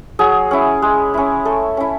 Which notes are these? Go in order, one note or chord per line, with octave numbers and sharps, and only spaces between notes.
F#3 G#4
C#4 E4
G#3
C#4 E4
A3 A4
C#4 E4